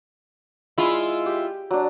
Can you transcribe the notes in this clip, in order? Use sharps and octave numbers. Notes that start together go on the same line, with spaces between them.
G#3 E4 F4
G4
F#3 D4